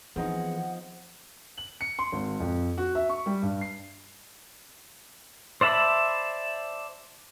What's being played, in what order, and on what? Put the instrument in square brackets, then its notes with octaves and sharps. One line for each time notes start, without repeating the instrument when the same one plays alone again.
[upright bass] E3 [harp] F3 C4 D#4 [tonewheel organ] B3 G#4 [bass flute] F#5
[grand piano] F#7
C#7
C6
G#1
F2
F#4
E5
C#6
G3
G2
C7
[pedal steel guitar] C5 D5 E5 A5 B5